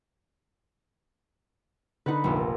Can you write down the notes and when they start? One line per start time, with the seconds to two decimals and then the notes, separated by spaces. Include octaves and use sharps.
2.06 D3 D#4 B4 F#5
2.24 F1 A#1